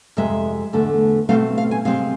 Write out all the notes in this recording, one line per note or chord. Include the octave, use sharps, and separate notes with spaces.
F2 C3 G#3 E5
E2 D3 A3
B2 A3 C4 F5
F5
G#5
C3 G#3 C4 F5